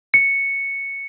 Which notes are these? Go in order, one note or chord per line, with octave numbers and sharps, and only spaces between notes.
C#7